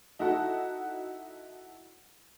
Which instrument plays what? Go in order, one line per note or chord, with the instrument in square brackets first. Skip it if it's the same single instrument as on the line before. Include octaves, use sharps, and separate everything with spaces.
[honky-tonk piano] D#4 E4 F#4 A4 F#5